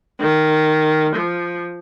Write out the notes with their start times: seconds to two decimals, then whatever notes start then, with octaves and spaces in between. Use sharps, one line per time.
0.20 D#3
1.16 F3